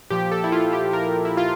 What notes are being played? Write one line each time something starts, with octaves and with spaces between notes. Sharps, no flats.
A#2 F3 G4
A4
E4
F4
F4
G4
A#4
E4
F4